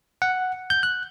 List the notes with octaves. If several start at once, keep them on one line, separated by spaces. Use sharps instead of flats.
F#5
G6
F#6